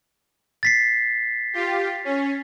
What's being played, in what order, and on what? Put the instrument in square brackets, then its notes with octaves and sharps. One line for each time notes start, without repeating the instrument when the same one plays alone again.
[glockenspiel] A6 B6 C7
[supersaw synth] F4 G4
C#4